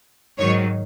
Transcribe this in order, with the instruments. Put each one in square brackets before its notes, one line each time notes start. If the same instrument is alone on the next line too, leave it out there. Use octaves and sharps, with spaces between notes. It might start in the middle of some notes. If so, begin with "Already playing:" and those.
[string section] G#2 D#3 F#3 C#5